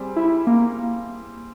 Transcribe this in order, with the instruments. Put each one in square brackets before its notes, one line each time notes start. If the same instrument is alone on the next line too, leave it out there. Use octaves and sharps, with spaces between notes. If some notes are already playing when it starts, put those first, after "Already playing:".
Already playing: [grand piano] G3 C4 G#4
[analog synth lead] E4
A#3